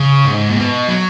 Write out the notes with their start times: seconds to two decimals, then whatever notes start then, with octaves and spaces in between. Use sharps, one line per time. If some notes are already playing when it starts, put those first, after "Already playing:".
Already playing: C#3
0.25 G#2
0.49 A#2
0.56 B2
0.88 F#3